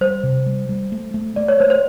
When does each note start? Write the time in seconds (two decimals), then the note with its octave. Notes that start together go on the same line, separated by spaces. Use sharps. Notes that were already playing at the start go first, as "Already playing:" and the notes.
0.01 G3 C5
0.23 C3
0.46 G3
0.69 G3
0.92 A3
1.14 A3
1.36 A3 D5
1.48 C#5
1.60 A3 C5
1.70 C5